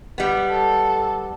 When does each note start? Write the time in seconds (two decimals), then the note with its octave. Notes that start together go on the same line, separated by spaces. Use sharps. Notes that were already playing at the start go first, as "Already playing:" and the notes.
0.18 G3 B3
0.51 A4